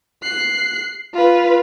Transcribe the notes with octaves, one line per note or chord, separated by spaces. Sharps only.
F#6 C7
F4 B4